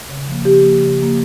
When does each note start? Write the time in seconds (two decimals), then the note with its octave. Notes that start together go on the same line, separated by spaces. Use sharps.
0.09 C#3
0.28 F3 A#3
0.44 C#3 G4
0.62 F3 A#3
0.80 C#3
0.98 F3 A#3